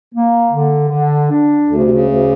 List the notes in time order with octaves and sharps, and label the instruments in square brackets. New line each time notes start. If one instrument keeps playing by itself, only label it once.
[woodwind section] A#3
D3
D3
D4
[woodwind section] D2 [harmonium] D3
[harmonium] C#3
C3
C#3
[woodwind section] D2